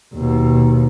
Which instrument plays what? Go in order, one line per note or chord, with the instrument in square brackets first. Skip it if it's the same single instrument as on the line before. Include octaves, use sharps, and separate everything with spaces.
[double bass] D#2 B2